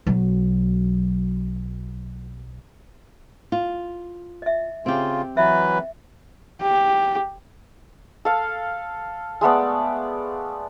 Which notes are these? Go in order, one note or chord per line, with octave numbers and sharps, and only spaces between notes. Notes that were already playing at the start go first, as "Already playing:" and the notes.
B1 F#3
F4
D#5 E5
C#3 C4 F4 G4
E3 F#3 B4 D#5 E5
G4
A4 F5
G#3 A3 B3 D5